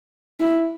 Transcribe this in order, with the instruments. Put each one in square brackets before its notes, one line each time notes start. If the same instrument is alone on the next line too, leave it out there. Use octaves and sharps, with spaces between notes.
[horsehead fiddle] E4